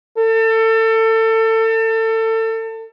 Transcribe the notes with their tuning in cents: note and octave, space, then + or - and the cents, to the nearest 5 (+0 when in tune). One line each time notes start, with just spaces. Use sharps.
A4 +30